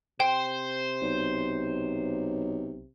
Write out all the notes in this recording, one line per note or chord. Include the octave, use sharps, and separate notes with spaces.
C3 C5 G5
B1